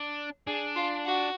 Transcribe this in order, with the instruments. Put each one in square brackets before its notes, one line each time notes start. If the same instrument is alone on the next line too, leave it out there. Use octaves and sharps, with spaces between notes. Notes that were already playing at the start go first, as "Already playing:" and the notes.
Already playing: [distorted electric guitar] D4
[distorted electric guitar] D4 [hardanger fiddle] G#4
[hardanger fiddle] F4
F#4